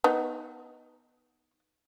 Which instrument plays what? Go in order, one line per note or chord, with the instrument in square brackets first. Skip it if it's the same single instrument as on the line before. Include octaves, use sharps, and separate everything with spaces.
[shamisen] B3 D#4